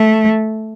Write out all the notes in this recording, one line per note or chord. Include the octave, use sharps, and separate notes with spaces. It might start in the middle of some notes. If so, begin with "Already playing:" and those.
Already playing: A3